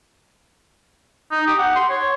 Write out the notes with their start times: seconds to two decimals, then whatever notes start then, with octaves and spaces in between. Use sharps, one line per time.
1.31 D#4
1.47 G4
1.59 F#5
1.75 C6
1.90 C#5